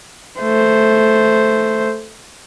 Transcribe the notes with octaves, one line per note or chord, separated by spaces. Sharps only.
A3 C5